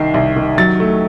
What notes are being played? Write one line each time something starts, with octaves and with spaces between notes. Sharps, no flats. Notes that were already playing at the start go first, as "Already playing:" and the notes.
Already playing: C2 D#3 C7
C2
D#3
F#3 A6
A3